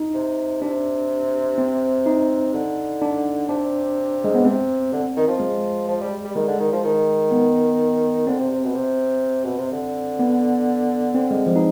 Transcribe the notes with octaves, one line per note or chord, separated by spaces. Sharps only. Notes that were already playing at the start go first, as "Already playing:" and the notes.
Already playing: D#4
C3
C3 D4
C4
D#4
D3
D4
C3 D4
G#3
B3
C3 C4
D3
D#3
F3
G#3
F3
G3
G3
D#3 G#3
D3
D#3
F3
D#3
B3
D3 C4
C3
C3
B2
C3
B2
C3
D3
B3
C4
G#3
F3
B2 D#4